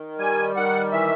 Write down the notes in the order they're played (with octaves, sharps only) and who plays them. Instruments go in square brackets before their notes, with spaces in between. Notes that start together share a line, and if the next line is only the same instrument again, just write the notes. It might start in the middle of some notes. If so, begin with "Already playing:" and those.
Already playing: [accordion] D#3
G3 G#5
D#3 F#5
E3 E5